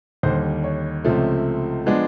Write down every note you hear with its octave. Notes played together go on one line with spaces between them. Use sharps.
D#2 D3 G3 C5
C#5
C#2 C3 F3 A3
F3 G#3 B3 D4